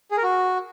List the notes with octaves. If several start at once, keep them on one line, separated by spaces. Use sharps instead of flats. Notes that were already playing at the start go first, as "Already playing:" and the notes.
G#4
A#4
F#4